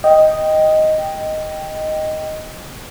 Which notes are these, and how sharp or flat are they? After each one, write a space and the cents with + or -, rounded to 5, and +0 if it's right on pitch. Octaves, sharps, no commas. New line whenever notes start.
D#5 +0 G5 +0